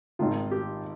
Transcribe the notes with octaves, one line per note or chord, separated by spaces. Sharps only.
G#1 G#2 D#3 F4
G4